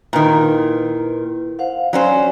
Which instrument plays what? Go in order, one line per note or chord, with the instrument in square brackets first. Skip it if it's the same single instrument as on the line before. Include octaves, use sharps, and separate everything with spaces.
[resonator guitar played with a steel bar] A#2 D#3 [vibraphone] E4 B4
[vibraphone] C5 F5 F#5
[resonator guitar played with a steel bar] F#3 C#4 C5 [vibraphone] D5 G#5